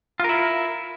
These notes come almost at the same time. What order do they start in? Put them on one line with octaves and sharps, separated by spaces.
F4 A#4 E4